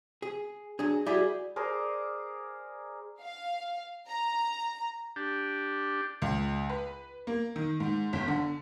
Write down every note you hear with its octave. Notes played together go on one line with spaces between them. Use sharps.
G#4
F#3 D4 G#4
G3 E4 F#4 G#4 D5
G#4 A#4 C5 D5
F5
A#5
D4 G4
C#2
B4
A#3
D#3
G#2
G1
D3